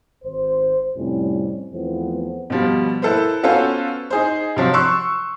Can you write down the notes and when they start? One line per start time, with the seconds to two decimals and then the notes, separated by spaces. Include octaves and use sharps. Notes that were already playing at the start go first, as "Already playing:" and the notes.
0.24 G#1 C5
0.96 F2 A2 C3 G3 C#4
1.73 E2 F3 A3 B3 C4
2.50 B2 F3 G3
3.02 A#3 E4 A4 B4 C5
3.43 B3 C#4 F4 F#4 A4 C5
4.10 D#4 G#4 C5
4.56 C3 F3 F#3
4.73 C6 C#6 E6 F#6